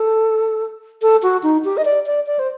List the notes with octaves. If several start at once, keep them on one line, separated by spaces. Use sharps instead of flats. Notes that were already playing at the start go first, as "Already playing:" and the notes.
Already playing: A4
A4
F#4
D#4
G4
D#5
D5
D5
D5
C5